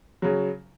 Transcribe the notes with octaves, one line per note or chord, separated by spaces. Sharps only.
C#3 F#3